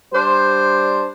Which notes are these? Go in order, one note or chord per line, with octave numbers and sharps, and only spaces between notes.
G3 D4 C5